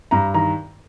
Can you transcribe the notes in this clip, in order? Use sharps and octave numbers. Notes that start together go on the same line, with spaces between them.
G2 A#5
D#3 A#5